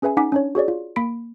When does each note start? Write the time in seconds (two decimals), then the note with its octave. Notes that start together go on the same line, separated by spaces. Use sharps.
0.02 C#4 G#4 B4 E5 G#5
0.17 C#4 D#4 F#5 G#5 D6 B6
0.32 C#4 D4 C#5
0.55 F#4 G#4 C#5 D5
0.68 F4
0.96 A#3 B5 B6 D7